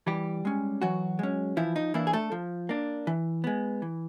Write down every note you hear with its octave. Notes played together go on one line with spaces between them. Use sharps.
E3 G3 G4
G#3 C#4
E3 F#3 F#4
G#3 C#4
E3 F3 E4
D#4
E3 A#3 D4 E4
G#4
A3 A4
F3
A#3 D4
E3
G#3 B3
E3